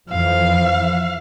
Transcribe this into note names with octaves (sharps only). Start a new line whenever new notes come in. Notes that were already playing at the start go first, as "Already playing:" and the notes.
F2 E3 F3 F5